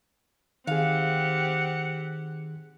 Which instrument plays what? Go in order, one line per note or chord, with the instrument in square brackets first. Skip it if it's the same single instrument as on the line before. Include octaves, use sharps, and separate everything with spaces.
[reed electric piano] D#3 G#4 [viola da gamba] C4 G4 [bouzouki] F5 [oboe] F#5